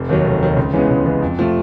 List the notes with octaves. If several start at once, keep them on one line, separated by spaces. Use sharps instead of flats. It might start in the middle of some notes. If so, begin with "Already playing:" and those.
Already playing: F1
D#2 D#3 F#3
F1
D#2 D#3 F#3
C#2
C#3 E3 G#3 B3
C#2
C#3 E3 G#3 B3
F2
C3 F3 A3